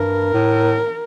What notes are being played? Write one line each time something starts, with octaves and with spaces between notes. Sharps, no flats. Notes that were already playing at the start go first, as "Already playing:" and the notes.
Already playing: G2 A#4
A2